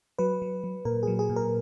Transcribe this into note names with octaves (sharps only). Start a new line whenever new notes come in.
F#3 B4
F#3
F#3
A#2 A#4
F#3 G#4
G#4
A#2
A#4